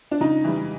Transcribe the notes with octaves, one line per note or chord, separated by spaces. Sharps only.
D4
C#3 D#4
E3 G3